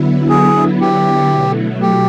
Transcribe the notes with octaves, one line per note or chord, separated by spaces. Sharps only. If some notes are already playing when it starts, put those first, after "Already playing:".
Already playing: D3 F#3 B3 E4
G#4
G4
B2 F#3 A3
G4